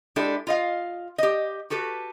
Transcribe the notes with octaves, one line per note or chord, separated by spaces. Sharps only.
G#3 D4 E4 G4 A4
F4 D#5 F5
G4 D#5
F#4 G4 A4 B4